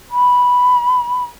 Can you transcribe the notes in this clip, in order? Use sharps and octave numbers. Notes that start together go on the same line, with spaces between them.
B5